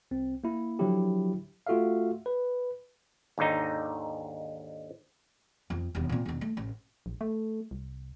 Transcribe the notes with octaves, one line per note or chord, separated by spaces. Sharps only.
C2 C4
A#3 E4
D3 F3 F#3 D4 E4 G4
A3 F4 F#4 A4 E5 F5
B4
D#2 G#2 D3 D#4
F2 F3
E1 D#2
A#2 C4
E1 D#3
A3
A1
A#1
A3
C2